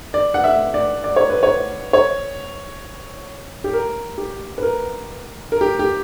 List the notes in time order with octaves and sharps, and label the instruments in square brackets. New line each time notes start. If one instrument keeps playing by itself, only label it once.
[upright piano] D5
F#5
E5
D5
D5
C#5
B4
C#5
C#5
G4
A#4
G4
B4
A#4
A#4
G4
G4